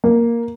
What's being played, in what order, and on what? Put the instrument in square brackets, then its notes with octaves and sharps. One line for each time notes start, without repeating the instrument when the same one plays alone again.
[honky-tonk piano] A#3